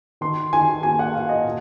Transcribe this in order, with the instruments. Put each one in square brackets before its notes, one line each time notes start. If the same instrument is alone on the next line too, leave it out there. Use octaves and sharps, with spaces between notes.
[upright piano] D#3 C6
D#3 G#5
A#3 G#5
F#5
A#3 F5
D#5
A#2